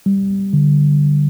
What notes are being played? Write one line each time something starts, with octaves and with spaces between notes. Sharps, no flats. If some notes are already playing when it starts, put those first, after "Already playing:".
G3
D3